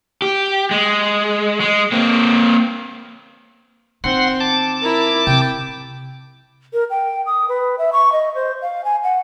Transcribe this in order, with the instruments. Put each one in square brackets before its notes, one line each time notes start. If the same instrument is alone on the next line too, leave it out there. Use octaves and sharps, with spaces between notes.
[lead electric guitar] G4
G#3
G#3
A#3 C4
[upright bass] D#3 D#4 [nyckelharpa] C4 [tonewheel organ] F#5 C6
[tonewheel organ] A5 D6
[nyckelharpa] E4 A#4
[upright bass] C3 [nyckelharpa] G5
[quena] A#4
G5
D#6
B4
E5
C#6
D#5
C5
F5
G#5
F#5